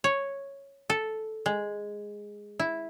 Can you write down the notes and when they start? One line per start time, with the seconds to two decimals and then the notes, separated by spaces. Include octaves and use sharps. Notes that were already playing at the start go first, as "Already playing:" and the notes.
0.04 C#5
0.90 A4
1.46 G#3
2.59 E4